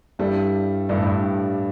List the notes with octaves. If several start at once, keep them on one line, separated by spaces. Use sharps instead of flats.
G2 G3 E4 A4 D5
G2 G3 E4 A4 D5
A2
G2